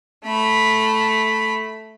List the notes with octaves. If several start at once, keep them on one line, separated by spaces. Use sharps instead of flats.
A3 B5